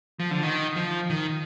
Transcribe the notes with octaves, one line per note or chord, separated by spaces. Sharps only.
F3
D3
D#3
F3
D#3